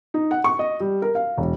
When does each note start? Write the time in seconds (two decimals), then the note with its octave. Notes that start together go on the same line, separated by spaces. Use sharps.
0.14 D#4
0.31 F#5
0.44 C#6
0.59 D#5
0.80 G3
1.02 A#4
1.15 F5
1.37 E1